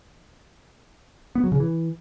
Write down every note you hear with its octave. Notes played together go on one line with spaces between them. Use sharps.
B3
F#3
C#3
E3